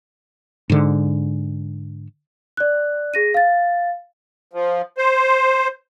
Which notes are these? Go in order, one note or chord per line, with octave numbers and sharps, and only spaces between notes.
G#2 D3
D5 F#6
G#4 A#6 D#7
F5 A6
F3
C5